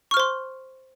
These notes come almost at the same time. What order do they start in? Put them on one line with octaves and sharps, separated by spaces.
C#6 F6 C5 C6